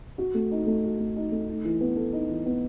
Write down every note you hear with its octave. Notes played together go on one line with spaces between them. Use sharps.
F#4
A3
D#4
A3
F#4
A3
D#4
A3
D#4
E3
B3
A4
D#4
E3
B3